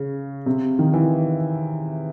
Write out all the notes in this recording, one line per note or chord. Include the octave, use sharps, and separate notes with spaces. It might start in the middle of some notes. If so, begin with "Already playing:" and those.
Already playing: C#3
C3
D#3
E3